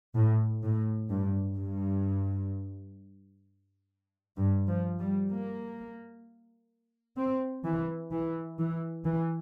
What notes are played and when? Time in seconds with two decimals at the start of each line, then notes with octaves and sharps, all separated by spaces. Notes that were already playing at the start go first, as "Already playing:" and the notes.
0.15 A2
0.63 A2
1.09 G2
1.56 G2
4.37 G2
4.68 F3
5.00 G3
5.31 A#3
7.17 C4
7.65 E3
8.11 E3
8.59 E3
9.05 E3